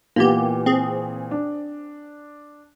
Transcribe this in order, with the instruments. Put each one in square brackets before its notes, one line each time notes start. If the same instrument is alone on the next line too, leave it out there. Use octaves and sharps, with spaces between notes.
[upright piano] A#2 E3 [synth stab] A#3 B3 G4
[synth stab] C4 G#4
[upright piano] D4